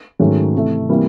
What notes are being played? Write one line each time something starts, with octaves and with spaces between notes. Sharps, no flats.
G#2 D#3 F#3 A3 C#4
C3 E3 A3
C3 E3 G3 A#3